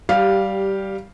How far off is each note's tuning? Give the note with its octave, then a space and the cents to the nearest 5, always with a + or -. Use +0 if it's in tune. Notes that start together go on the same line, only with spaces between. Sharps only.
G3 -10 G4 +0 F5 +0